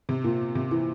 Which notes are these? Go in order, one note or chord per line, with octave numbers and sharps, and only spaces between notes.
C3
A#2
C3
E3